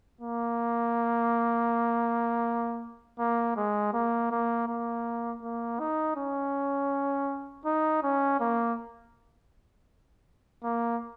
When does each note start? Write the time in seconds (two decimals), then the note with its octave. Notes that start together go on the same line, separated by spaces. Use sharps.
0.21 A#3
3.19 A#3
3.56 G#3
3.93 A#3
4.31 A#3
4.68 A#3
5.43 A#3
5.79 D#4
6.17 C#4
7.65 D#4
8.03 C#4
8.40 A#3
10.63 A#3